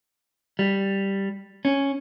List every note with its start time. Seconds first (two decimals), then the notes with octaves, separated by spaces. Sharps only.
0.59 G3
1.65 C#4